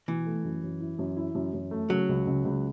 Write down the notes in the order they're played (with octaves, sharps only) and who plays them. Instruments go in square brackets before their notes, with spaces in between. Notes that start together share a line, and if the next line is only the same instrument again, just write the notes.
[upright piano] B2 [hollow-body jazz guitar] E3
[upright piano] A3
F#2
F#2
E4
F#2
E4
F#2
F#2
A3
[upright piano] C#3 [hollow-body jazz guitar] F#3
[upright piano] C#2
C#2
C#2